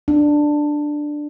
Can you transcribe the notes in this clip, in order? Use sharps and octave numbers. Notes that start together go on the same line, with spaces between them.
D4